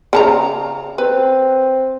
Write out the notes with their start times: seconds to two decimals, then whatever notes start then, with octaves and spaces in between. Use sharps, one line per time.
0.13 C#3 A5 A#5
0.98 C4 B4